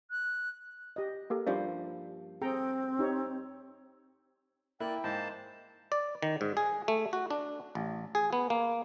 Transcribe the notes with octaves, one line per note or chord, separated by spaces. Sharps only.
F#6
G4 D#5
A#3 G4 A4 A#4
G2 F3 A#3 C#4 C5 D5 E5
C4 G#4 A4 G5 A#5
D#4 G4 C#5
A#3 E4 D5 G5 F#6
G#2 A#3 C5 A5
D5
D#3
G#2
G#4
A3
F#4
D4
A1
G#4
B3
A#3